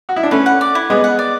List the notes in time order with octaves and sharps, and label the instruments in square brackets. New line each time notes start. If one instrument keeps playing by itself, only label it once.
[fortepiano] F#4
E4
D4
[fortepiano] A3 C#4 [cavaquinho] B4
[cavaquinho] F#5
D5
E4
[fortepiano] G#3 B3 [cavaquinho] B4
[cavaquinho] F#5
D5